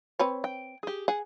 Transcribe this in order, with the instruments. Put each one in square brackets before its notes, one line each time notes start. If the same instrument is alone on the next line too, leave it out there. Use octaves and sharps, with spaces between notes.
[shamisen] C4 B4 C#5
[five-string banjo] G5
G4 G#4
[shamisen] G#4 [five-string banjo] F#5